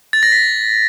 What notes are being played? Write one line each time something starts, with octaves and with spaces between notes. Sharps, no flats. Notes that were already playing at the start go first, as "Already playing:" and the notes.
A6
A#6
B6